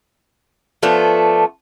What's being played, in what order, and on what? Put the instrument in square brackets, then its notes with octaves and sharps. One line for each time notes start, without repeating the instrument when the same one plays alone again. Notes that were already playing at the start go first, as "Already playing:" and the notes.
[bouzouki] F3 A3 B3 D4